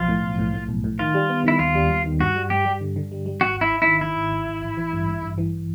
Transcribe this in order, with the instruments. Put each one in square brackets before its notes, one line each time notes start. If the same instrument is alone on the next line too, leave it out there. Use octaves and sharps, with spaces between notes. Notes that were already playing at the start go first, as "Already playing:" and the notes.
Already playing: [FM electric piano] B1 F3 [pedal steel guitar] F4
[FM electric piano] A2
B1
A2
A2
B1
A2
[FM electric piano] D#3 [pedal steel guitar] F4
[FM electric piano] G3
B3
[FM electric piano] D#3 [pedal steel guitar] E4
[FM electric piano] D#2 [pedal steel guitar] F4
[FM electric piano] G3
D#2
D#3
[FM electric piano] G2 [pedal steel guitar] F#4
[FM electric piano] G3
[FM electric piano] G3 [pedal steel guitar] G4
[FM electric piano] G3
D3
D3
G3
G3
[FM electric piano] G#1 [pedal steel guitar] F#4
[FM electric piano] G#1 [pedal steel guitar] E4
[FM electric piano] G#1
[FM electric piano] D#3 [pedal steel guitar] E4
[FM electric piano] D#3 [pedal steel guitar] E4
[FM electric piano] G#1
G#1
G#1
A1
E3
G2
G2
G2
E3